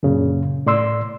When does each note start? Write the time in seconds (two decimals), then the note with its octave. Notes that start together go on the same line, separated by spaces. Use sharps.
0.03 F#2 A#2 C#3
0.66 A2 D5 C6 E6